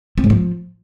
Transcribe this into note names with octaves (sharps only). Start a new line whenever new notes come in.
C4
G#2
F3